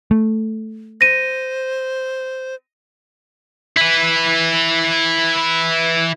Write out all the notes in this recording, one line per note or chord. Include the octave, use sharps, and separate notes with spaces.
A3
C5 A#6 D#7
E4 B4